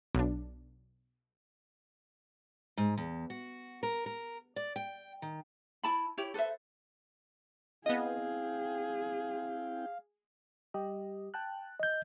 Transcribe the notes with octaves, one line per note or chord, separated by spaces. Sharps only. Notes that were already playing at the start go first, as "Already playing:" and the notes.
B1 D4
G#2
E2
F#4
A#4
A#4
D5
G5
D#3
E4 A5 B5
E4 G4 C#5
A4 B4 C5 E5
B3 C4 E4 G#4 D#5 F5 G5
G3 G4 D#5
G5 A5 F#6
D#5 G6